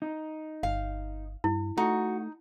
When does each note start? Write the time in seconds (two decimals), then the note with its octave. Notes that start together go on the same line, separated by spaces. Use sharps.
0.02 D#4
0.63 G1 F5
1.44 G2 E4
1.78 A3 D#4 F#4